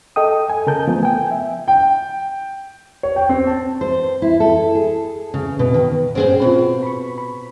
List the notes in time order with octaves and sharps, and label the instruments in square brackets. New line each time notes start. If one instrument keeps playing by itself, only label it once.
[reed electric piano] A4 D#5 G5 D#6
G#5
C#3 A#4 A5 G6
F3 A3 B3
G5 G#5
E5
[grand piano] G5
[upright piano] C#5
G5
C4
A5
[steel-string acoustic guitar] C5
E4
A4
G#4
C#3
B2
D#3
[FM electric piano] G2 A#2 C#4 [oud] C4 G#4 C5
[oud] B2 [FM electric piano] C4 F4
[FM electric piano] B5 C#6
B5